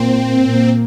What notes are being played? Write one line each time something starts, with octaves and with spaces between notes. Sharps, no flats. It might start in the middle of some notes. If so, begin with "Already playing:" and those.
Already playing: A#2 A#3 C4
A#2 A#3